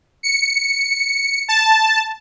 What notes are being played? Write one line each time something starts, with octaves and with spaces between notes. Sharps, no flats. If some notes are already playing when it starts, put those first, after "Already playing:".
C#7
A5